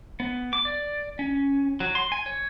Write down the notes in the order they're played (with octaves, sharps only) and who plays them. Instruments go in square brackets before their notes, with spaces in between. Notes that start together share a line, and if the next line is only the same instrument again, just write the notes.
[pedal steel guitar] B3
D6
D5
C#4
F#3
C6
G#5
C#5